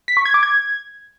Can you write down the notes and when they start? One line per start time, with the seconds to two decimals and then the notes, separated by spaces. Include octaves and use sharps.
0.08 B6
0.17 C#6
0.25 G#6
0.34 D6
0.43 G#6